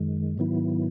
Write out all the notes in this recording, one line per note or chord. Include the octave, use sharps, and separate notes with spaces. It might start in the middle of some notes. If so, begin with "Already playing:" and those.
Already playing: F#2 D#3 G#3
G#2 D#3 F#3 B3 E4